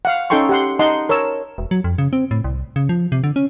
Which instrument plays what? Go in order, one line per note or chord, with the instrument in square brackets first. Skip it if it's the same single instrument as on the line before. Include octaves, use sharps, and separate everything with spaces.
[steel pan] F5 F#5
C#4 D#4 A4 G5 C6 C#6
G4 F#5 C6
D#4 D#5 F#5 A5 C6
A#4 C#5 A5 E6
[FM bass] E1
F#3
F2
C#3
C4
A2
C2
C#3
F3
C3
D3
C#4